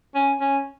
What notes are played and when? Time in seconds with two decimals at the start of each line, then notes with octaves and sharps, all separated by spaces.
0.15 C#4
0.40 C#4